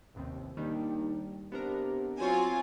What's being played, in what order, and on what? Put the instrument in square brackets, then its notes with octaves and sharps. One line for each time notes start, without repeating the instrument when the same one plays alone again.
[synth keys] A1 D#2 C3
[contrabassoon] D#2 [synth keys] D#3 G3 D4
[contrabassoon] C3 [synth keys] B3 D4 A#4
[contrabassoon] F#3 [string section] C4 F4 G#5 [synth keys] C5 C#5 F5